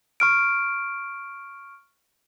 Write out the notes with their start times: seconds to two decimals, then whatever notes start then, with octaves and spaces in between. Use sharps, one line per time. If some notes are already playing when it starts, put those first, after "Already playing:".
0.20 C#6 F6 D7